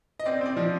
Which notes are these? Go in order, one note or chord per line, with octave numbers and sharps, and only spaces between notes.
D#5
C4 D5
C4 D5
F3